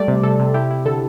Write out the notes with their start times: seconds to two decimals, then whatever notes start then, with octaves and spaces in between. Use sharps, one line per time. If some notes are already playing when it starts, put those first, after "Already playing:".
Already playing: G3 A3 D5
0.08 C3
0.23 C3 A4
0.39 C3
0.54 E4 G4
0.71 E4
0.86 D3 A4